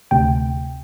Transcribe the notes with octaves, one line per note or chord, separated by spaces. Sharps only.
D2 C3 G5